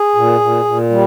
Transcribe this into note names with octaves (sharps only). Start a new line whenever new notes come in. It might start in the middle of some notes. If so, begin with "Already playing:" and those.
Already playing: G#4
A#2
A#2
A#2
G3